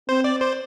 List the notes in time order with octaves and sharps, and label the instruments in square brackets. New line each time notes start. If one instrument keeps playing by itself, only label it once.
[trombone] C4 [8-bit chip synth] C5
[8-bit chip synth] D5
C5